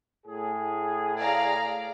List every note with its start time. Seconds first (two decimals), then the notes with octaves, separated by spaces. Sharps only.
0.26 A2 G#4
1.16 D5 F5 A#5